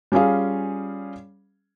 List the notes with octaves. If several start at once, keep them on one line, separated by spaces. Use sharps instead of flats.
G3 C#4 F4 G#4 F5